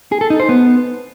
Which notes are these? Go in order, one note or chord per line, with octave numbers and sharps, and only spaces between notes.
G#4
A4
D#4
C5
B3